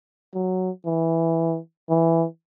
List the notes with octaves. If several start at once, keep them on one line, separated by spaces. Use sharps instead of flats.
F#3
E3
E3